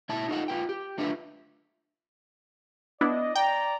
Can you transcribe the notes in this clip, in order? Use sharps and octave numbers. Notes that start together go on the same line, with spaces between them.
B2 E4 E5 A5
D#4 F4 A4 F#5
F4 B4 G5
G4
A3 D4 F4 B4 E5
B3 D4 E4 D5 D#5
D5 G5 A#5